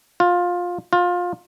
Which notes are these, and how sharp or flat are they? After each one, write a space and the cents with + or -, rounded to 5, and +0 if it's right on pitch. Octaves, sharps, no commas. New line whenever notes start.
F4 +15
F4 +20